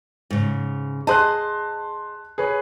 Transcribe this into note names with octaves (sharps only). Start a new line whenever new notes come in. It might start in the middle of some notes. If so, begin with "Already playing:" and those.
G#2 C#3
G#4 C5 D#5 A5 C6 F#6
G#4 B4 C#5